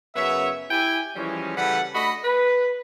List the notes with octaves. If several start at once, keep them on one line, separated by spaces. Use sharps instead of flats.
F#2 C#3 B3 C#5 E5
E4 G4 G5 G#5
E3 F3 G3 G#3 C#4
C#3 E3 G3 A4 B4 F#5
A3 D4 F#4 D#5 B5
B4